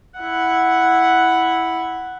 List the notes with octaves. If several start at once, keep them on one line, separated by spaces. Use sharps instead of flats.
E4 F#5